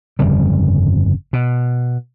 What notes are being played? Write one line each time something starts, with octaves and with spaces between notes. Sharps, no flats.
G1 F2 C#3 G3
B2